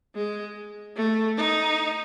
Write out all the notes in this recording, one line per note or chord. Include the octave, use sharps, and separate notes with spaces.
G#3
A3
D#4